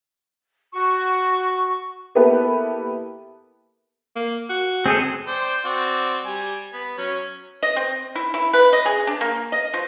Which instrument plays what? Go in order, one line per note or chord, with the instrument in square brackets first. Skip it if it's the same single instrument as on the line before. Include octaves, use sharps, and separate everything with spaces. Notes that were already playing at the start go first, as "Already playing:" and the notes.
[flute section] F#4 C#6
[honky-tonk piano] A#3 B3 E4 G4 A4 B4
[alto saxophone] A#3
F#4
[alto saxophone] G#3 [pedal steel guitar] C4 G#4 A4
[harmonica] C5 D5 G5
C4 F#4 D5
G3 G#5
B3
F#3 C#4
[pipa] D#5
C4
E4
E4
B4
D#5
G#4
D4
A#3
D#5
F3